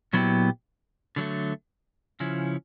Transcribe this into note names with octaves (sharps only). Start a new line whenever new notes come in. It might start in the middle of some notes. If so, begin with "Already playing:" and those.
A#2 F#3 B3 E4 G4
D3 F#3 A3
C#3 F3 C#4 E4